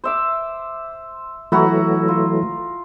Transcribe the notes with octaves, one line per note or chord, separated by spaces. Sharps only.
C5 E5 D6
E3 F#3 A3 E4 F#4 A#5
F4